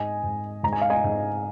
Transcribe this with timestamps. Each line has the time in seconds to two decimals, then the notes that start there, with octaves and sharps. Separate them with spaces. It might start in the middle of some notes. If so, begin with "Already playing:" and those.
Already playing: G#2 D#5 G#5
0.23 G#2
0.63 G#2 A#5
0.72 G#5
0.81 F5
0.90 D#5 G#5
1.04 G#2